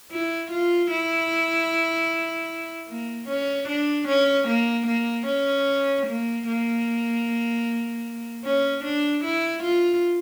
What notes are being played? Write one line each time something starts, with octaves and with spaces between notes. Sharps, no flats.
E4
F4
E4
A#3
C#4
D4
C#4
A#3
A#3
C#4
A#3
A#3
C#4
D4
E4
F4